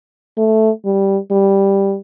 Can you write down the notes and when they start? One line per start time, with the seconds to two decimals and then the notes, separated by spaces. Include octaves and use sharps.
0.37 A3
0.85 G3
1.31 G3